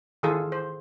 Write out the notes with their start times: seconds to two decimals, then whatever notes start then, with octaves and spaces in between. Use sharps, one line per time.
0.23 D#3 E3 F4 G#4 A4
0.52 C5